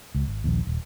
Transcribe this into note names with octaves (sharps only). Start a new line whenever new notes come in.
C#2
G#1
A#1 D#2
D#1